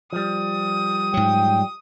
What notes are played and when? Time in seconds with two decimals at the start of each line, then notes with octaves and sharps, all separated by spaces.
0.13 F3 G3 D#6
1.14 G#2 F#3 G5